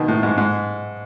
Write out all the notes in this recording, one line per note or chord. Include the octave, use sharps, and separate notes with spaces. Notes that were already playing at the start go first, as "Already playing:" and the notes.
Already playing: B2 D#3
A2
G#2
G#2